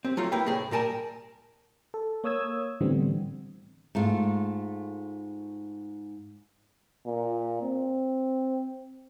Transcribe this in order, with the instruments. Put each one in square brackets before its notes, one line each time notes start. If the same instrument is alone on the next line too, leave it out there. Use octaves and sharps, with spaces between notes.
[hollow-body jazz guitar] C4 G4
F#3 A3 F4
A#3 E4 G4 B4 G5
C2 A2 G#4
A#2 G3 A#4 G#5 A5
[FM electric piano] A4
A#3 C#5 D#6 E6 G#6
A2 D3 E3 G3 B3 C4
[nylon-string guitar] G#2 A3 F4
[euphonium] A#2
C4